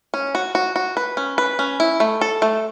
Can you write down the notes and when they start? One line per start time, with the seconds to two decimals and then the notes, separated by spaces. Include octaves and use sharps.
0.14 C#4
0.35 F#4
0.55 F#4
0.76 F#4
0.97 B4
1.17 C#4
1.38 B4
1.59 C#4
1.80 E4
2.00 A3
2.21 A4
2.42 A3